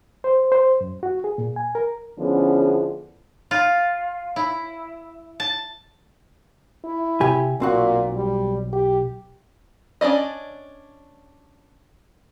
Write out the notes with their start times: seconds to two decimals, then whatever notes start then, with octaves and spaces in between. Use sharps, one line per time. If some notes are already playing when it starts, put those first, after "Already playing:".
0.24 C5
0.52 C5
0.81 F#2
1.03 F#4
1.24 G#4
1.38 A#2
1.56 G#5
1.75 A#4
2.19 D3 F3 B3 C#4 E4 G#4
3.51 F4
4.36 E4
5.40 A5
6.84 E4
7.21 C3 G4 G#5
7.60 B1 A#2 C4 F#4
8.15 G3
8.73 G4
10.01 C#4 D4 D5 D#5